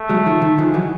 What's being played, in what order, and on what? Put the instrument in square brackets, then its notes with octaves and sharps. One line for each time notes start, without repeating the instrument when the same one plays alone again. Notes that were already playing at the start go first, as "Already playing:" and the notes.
Already playing: [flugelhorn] A3
[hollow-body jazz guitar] F#3 G#3
D#3 F3
D#3
[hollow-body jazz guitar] D#3 F3 [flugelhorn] G#3
[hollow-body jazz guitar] E3 F#3